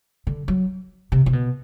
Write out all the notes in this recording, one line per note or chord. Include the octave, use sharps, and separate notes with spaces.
D3
F#3
C3
C3
B2